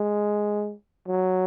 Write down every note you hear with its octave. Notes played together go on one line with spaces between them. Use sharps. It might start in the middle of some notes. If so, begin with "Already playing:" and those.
Already playing: G#3
F#3